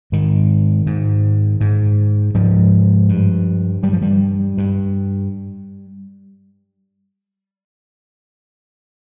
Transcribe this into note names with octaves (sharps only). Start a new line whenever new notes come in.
G#2 D#3
G#2
G#2
G#2 F3
G2
G2 G3
F3
G2 G3
G2